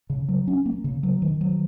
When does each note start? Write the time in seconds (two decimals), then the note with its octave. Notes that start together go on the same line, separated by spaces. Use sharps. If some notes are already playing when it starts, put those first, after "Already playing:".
0.10 C#3
0.28 F#3
0.47 C#4
0.66 A#3
0.84 C#3
1.03 F#3
1.22 D#3
1.41 F#3